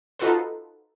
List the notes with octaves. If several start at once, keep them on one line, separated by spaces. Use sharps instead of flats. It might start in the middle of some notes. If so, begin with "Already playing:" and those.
D#4 F4 F#4 A4 B4 C5